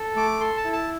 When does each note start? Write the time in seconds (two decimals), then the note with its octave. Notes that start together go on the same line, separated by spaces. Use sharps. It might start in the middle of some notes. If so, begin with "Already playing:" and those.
Already playing: A4
0.16 A3 D6
0.40 A4 C6
0.57 A5
0.64 E4
0.73 A5